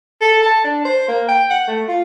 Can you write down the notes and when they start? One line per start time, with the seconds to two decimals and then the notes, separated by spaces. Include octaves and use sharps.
0.21 A4
0.42 A5
0.64 D4
0.85 C5
1.08 A#3
1.28 G5
1.50 F#5
1.67 A3
1.88 F4